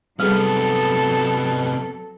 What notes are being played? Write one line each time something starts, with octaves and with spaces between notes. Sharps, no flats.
C3 F#3 G3 B3 G#4 A4